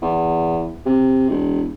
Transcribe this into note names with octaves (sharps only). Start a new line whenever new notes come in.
E2
C3
E1